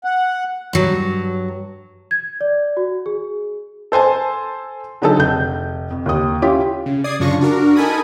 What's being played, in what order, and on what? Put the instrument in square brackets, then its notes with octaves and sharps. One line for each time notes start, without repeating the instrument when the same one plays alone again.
[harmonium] F#5
[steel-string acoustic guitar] G2 F#3
[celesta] G#6
D5
F#4
G#4
[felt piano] A4 C5 G#5 A5
D3 F#3 D#4 G#4 A4
F1 G6
F2
D#2 D#6
C#4 E4 F4 G4
[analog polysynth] C#3
D5 D#6 G#6 C7
F#2 C#3 D4 F4 C#6 A#6
D4 F#4 A#4
D#4 A4 A#4 G#5 B5 D#6